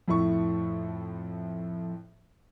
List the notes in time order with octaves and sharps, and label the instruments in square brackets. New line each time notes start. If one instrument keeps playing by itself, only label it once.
[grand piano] F2 A2 E4 C#6